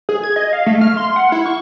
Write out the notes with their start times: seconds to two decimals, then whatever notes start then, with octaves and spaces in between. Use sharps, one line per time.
0.09 G#4
0.23 G#6
0.36 D#5
0.53 F5
0.66 A3
0.81 F6
0.97 C6
1.16 F#5
1.32 E4
1.46 C#6